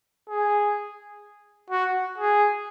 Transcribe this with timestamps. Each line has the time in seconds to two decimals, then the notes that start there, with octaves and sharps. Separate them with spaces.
0.29 G#4
1.70 F#4
2.18 G#4